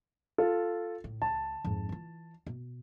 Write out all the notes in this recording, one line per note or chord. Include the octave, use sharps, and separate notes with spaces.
F4 A4
A2
C#2 A5
F2 G#2
E3 F4
B2